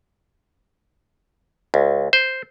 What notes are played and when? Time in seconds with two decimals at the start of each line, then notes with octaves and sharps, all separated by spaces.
1.74 C#2
2.13 C5